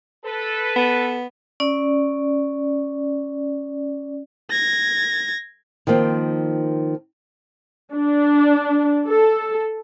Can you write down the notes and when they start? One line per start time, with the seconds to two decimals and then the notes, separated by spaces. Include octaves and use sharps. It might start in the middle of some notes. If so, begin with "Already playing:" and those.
0.25 A4 B4
0.76 B3
1.60 C#4 D5
4.50 G#6 A#6
5.87 D#3 F3 A#3 C4
7.93 D4
9.07 A4